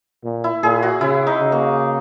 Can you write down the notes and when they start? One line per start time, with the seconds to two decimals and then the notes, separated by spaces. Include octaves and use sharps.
0.24 A#2
0.44 E4
0.63 A#2 G#4
0.83 F#4
1.01 C#3 E4
1.27 D#4
1.40 C#3
1.52 A#3